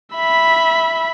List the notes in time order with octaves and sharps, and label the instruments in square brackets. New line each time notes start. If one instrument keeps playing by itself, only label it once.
[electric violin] E5 B5